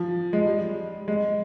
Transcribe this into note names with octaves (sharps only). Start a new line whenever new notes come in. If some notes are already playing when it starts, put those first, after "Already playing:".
Already playing: F3
G#3
G3
G#3